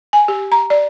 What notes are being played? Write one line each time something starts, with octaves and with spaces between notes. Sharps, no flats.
G#5
G4
A#5
D5